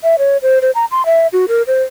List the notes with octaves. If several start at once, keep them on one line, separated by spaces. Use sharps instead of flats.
E5
C#5
C5
C5
A#5
C6
E5
F#4
A#4
C5